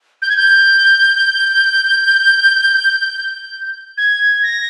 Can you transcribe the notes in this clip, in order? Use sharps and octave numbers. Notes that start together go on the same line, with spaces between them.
G6
G#6
G6
G#6
A#6